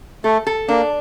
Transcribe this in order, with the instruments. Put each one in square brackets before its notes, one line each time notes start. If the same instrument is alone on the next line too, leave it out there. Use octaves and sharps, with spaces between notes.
[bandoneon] A3 [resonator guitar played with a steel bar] A4
[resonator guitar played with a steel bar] A4
[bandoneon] A#3 [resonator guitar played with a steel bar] D4